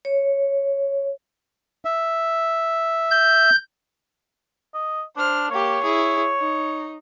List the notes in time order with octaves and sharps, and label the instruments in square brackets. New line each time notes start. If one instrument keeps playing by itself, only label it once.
[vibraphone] C#5
[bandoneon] E5
[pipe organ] G6
[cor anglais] D#5
[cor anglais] D4 [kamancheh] C5 F6
[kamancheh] A#3 G4 [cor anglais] C#5
[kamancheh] E4 G#4
D#4